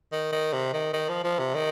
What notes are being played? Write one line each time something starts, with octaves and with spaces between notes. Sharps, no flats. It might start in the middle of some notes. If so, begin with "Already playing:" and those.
D#3
D#3
C3
D#3
D#3
F3
F3
C3
D#3